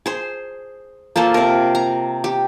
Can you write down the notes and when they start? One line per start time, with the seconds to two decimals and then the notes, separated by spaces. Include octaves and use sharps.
0.06 G#4 C5
1.16 A#3 F4 A4 C5
1.34 C3 A#4
1.75 A#5
2.24 G4